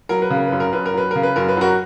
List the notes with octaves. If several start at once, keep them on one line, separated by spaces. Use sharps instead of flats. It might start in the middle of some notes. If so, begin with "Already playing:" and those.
F#3 A#4
B4
C#3 A#4
F#2 B4
A#4
F#2 B4
A#4
F#3 B4
C#3 A#4
B4
F#2 A#4
B4
F#3 F#4 A#4